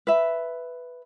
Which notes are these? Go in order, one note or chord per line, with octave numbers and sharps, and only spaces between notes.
B4 E5